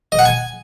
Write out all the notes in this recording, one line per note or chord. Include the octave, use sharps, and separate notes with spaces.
D#5
F#5
G#5